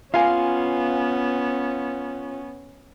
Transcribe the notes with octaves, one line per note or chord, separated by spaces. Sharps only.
B3 C#4 F4 F5 G#5